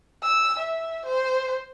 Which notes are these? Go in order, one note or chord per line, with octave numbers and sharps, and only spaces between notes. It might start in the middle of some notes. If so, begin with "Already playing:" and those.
E6
E5
C5